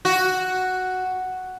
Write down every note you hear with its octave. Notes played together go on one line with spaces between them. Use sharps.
F#4